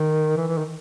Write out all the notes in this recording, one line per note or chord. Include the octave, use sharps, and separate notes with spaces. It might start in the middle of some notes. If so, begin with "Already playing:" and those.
Already playing: D#3
E3
E3
D#3